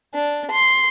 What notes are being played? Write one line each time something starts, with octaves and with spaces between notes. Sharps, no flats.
D4
C6